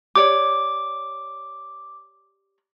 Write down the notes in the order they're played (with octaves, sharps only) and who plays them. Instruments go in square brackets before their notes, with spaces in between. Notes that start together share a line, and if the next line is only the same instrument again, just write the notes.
[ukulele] G4 C#5 D5 [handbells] D6